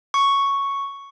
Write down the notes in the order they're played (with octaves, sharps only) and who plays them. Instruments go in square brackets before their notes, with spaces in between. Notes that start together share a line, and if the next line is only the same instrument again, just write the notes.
[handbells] C#6